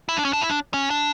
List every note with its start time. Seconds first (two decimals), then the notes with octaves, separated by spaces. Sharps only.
0.09 E4
0.17 D4
0.25 C#4
0.33 D4
0.41 E4
0.50 D4
0.74 C#4
0.90 D4